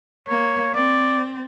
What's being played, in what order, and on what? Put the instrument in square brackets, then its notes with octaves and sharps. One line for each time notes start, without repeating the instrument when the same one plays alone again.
[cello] A#3 [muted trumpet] C#5
[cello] C4 [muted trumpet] D5